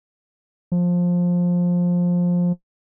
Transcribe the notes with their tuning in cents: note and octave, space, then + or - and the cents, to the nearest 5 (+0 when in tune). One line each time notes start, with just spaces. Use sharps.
F3 +15